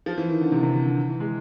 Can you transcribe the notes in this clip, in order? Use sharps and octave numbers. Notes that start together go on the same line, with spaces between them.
F3
E3
D#3
D3
C3
C3
D3
E3
G#3